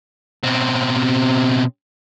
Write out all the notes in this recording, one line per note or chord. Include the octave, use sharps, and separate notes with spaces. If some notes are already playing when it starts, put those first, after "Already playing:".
B2 C4